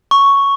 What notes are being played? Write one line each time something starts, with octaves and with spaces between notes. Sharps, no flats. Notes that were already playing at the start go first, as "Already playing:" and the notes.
C#6